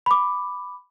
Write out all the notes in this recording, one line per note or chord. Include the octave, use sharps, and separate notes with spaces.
B5 D6